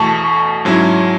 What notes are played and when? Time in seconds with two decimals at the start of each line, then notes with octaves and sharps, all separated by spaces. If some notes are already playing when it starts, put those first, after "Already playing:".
Already playing: E2 B2 A3 A5 C#6
0.65 G#2 F#3 C#4 E4